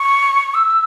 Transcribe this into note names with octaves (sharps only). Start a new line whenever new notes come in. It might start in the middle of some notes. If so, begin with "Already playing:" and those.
Already playing: C#6
E6